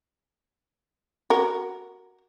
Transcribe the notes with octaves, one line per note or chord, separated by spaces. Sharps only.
F#4 A#4